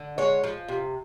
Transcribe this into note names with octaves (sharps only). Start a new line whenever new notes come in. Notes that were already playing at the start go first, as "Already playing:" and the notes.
Already playing: D3
G#3 C#5
F3
C3